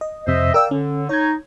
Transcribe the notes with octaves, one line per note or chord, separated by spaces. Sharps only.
D#5
F2 C3 C5 D#5 E5
A#4 D5 F5 G5 E6
D3 C#4
D#4 C#5 G#6